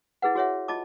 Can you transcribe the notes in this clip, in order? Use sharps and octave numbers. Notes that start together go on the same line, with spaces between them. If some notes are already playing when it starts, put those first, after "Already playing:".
E4 G#4 B4 F#5
F#4 G#4 C#5 E5 F#5
F4 D#5 A5 D6